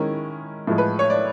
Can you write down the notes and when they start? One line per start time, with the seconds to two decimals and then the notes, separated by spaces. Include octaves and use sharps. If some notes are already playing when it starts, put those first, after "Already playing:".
Already playing: D#3 G#3 C#4 E4 A#4
0.67 A2 F3 G#3
0.78 B4
0.99 C#5
1.10 D5